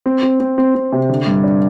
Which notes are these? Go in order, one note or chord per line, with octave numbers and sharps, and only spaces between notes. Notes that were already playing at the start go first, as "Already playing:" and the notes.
C4
C4
C4
C4
C4
C3
D3
G2
D4